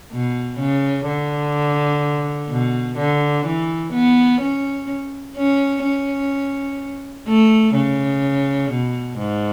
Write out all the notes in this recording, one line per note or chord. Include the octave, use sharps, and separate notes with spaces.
B2
C#3
D3
B2
D3
E3
B3
C#4
C#4
C#4
A3
C#3
B2
G#2